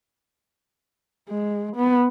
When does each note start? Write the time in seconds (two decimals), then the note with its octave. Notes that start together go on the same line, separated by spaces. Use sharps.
1.29 G#3
1.76 B3